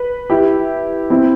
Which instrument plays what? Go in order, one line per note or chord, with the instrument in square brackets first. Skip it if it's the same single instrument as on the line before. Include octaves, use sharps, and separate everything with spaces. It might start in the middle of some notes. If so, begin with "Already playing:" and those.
Already playing: [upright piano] B4
E4 G4
C4 E4